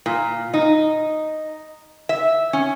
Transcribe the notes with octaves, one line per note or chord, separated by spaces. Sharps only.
A#2
D#4
E5
C#4